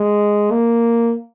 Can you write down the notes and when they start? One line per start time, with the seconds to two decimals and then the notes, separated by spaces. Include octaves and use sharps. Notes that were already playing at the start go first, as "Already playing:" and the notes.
Already playing: G#3
0.51 A#3